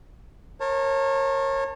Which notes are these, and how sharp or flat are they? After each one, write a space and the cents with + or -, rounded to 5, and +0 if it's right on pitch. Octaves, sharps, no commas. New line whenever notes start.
A#4 +0 C#5 -30 A5 +20